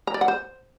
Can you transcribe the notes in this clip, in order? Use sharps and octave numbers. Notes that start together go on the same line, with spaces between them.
A#5
D5
F#5
C5